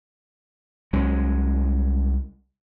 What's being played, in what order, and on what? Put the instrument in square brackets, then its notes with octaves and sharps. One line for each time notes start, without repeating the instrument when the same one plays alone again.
[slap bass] C2 F#3 G#3 C#4